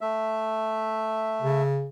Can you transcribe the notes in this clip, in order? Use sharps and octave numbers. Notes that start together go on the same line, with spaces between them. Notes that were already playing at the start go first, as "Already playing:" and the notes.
A3 E5
C#3